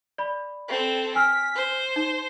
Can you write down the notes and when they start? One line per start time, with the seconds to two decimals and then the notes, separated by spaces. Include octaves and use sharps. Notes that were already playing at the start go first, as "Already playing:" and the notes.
0.18 D5 B5
0.68 C4 A4
1.15 G#5 E6 F6 B6
1.55 C5
1.96 D#4